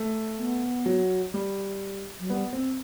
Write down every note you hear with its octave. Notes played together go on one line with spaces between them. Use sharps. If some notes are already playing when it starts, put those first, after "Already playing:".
Already playing: A3
B3
F#3
G3
F#3
G3 B3
C4